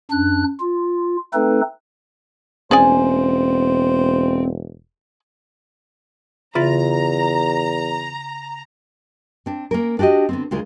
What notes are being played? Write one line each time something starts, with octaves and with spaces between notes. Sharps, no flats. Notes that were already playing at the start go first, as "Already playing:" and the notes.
F#2 D4 F#6
F4
A3 C4 D#4 A4 B4
E1 C4 C#4 G#4 C5 D5 G#5
E2 C#3 F4 E5 A#5 B5 A6
C4 D4
A#3 C#4 A#4
D4 F#4 G4 C5 D#5
D3 B3 C4
D2 C#3 G#3 F4 A#4